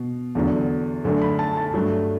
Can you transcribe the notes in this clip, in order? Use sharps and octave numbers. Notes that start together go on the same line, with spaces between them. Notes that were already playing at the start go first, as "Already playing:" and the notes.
Already playing: B2
E2 D3 F#3
F#2 D3 A3
B5
A5
A5
G2 F#3 A3